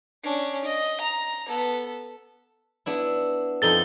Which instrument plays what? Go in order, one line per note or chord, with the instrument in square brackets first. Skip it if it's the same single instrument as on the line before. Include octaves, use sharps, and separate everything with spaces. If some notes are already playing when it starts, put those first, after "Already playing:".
[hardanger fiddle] C#4 D4
D#5
A#5
B3 A4
[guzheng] B3 D4 E4
[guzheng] F2 D#4 A4 [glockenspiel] A6 G7